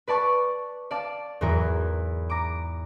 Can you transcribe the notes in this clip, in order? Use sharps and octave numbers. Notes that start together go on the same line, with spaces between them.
B4 D5 A5 C#6
D5 F5 A5
E2 G#2 E3 F#3 A#4
A#5 D6